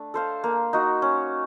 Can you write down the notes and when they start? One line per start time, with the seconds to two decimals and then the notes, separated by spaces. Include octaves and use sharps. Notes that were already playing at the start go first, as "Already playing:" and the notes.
Already playing: A3 D4
0.14 A4 C5 F5
0.44 A#3
0.73 D#4 F#4
1.02 C#4